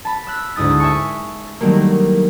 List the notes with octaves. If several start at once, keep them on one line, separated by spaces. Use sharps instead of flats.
A5 B5
E6 F#6 B6
D2 G#2 E4 D#6 A6
E5 G#5 A5 C#6
D#3 F#3 G3 A3 A#3